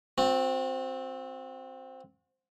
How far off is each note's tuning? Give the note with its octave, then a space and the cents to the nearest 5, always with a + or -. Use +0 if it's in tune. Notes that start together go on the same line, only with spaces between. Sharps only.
C4 +0 F#4 -35